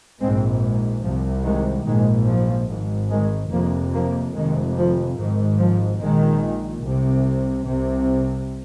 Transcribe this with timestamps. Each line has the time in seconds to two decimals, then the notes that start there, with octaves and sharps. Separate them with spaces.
0.20 A#1 G#2 G#3 C4
1.03 C2 C3 F3
1.44 D#3 G#3
1.86 A#1 G#2 D#3 G#3
2.28 F3
2.69 G#1 G#2
3.10 D#3 G#3
3.51 F1 F2 C3 F3 A#3
3.93 F3 A#3
4.34 F1 F2 C3 D#3 G#3
4.76 F3
5.17 G#1 G#2 D#3
5.59 F3
6.00 A#1 A#2 D#3 G#3
6.83 C2 C3
7.66 C2 C3